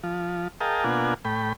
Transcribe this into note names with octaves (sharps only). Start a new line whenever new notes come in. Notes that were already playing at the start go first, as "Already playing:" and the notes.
F3
G#4 A#4 D#5 F5 G5 A5
B2 A#3 D4 F4 F#5 G#5
A2 G5 B5